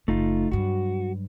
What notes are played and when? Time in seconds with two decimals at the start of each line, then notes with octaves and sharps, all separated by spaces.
0.08 F#1 C#3 A3 D#4 F4
0.51 G2 F#3 F#4